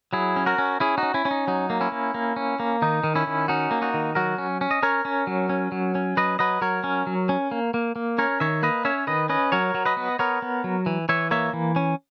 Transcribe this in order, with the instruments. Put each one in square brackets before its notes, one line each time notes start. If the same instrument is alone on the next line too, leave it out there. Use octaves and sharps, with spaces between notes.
[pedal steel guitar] F#3 E4 G#4
C#4
F#4 A#4
C#4
C#4 E4 G#4
D#4 F#4
C#4
C#4 E4
C#4
D#4
F#3 D#4
A#3
C#4 E4
A#3
A#3
C#4
A#3
D#3 D#4
D#3
C#4 E4
D#3
C#4 D#4 F#4
A#3
D#4 F#4
D#3
F#3 F#4 A#4
C#4
C#4
D#5
C#4 A#4 C#5
C#4
F#3
C#4
F#3
C#4
F#3 B4 D#5
F#3 B4 D#5
F#3 A#4 C#5
C#4
F#3
C#4
A#3
A#3
A#3
C#4 A#4 C#5
D#3 C#5 E5
A#3 B4 D#5
C#4 C#5 E5
D#3 B4 D#5
C#4 B4 D#5
F#3 A#4 C#5
F#3
B4 D#5
B3
B3 A#4 C#5
B3
F#3
E3
E3 C#5 E5
A#3 C#5 E5
E3
C#4